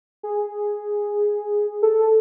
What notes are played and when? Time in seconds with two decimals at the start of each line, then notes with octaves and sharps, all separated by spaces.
0.23 G#4
1.82 A4